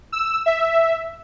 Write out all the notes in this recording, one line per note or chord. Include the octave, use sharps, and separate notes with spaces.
E6
E5